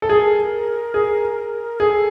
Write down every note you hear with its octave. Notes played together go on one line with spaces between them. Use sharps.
A4
G#4 A#4
G#4
G#4 A4